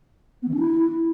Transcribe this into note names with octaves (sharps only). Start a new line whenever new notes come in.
B3
E3
D4
E4